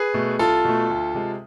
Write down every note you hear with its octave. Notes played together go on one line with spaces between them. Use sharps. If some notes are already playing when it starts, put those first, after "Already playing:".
Already playing: G#4 B4
B2 A3
C2 F4 A4
B2 A3
D2
C3 G#3